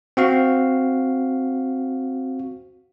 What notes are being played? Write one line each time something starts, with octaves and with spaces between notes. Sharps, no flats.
C4 F#4 F5